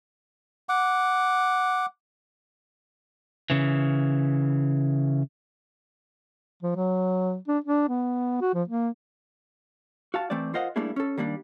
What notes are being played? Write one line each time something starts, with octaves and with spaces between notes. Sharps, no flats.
F#5 D6
C#3 E3
F3
F#3
D4
D4
B3
F#4
F3
A#3
F#4 F5 A5
E3 A3 C4 C5 D5
F4 A#4 C5 D#5 F5 F#5
G3 A3 A#3 D4 E4 G#4
C#4 A4
D#3 G3 A#3 C4 D4